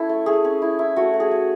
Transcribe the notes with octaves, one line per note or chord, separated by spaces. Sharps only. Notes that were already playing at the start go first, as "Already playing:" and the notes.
Already playing: C#4 E4 A4
A3
A3 G#4
C#4
E4
E4
A3 F#4
A3
G#4
A3